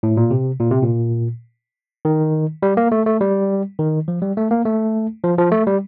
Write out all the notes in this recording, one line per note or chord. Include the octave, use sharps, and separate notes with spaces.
A2
A#2
C3
A#2
C3
A#2
D#3
G3
A#3
A3
A3
G3
D#3
F3
G3
A3
A#3
A3
F3
F3
A3
G3